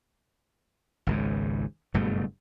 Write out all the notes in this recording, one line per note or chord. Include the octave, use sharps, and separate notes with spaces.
G#1 C#2 G#2
F#1 G2 B2 A3